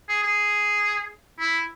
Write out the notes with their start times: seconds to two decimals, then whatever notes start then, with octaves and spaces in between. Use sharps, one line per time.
0.09 G#4
0.23 G#4
1.40 E4